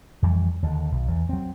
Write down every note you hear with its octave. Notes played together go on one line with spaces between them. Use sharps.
F2 E3 G3
D#2 D3
B1
E2
F#3 C4